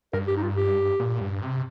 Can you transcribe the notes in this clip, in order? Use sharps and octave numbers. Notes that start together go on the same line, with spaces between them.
G2 A#4
G4
D#4
F4
G4
A#2
G2
C3